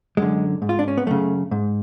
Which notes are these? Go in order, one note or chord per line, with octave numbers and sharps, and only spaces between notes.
F#2 D3 G#3
G#2
F4
D4
C#4
B3
F#2 C#3 A3
G#2